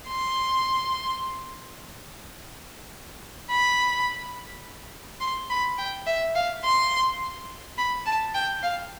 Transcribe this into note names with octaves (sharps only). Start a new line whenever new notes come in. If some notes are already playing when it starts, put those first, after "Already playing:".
C6
B5
C6
B5
G5
E5
F5
C6
B5
A5
G5
F5